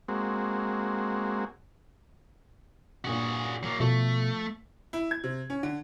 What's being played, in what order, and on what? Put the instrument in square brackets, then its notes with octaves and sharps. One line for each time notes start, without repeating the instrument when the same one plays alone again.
[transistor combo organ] G#3 A#3 C4 F#4
[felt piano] G2 A#2 [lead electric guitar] F#4 G#4
[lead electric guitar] F#3 A#3
[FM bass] B2 [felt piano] F3 A4 C#6 [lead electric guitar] A3
[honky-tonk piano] E4
G#6
C3
C#4
D3